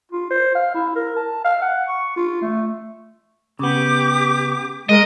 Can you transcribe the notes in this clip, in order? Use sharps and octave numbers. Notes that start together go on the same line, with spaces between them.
F4
C5
F5
E4
A#4
A5
F5
F#5
C#6
F4
A3
C#3 B3 G4 D6
G#3 A#4 D#5